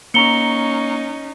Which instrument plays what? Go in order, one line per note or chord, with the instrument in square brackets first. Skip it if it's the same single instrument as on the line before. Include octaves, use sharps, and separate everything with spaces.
[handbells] A#3 A#5 C#6 [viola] C#4 D#4 [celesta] C#7 G7